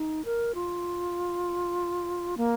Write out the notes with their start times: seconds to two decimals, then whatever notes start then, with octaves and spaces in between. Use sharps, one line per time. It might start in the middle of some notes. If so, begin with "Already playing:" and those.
Already playing: D#4
0.25 A#4
0.55 F4
2.37 A#3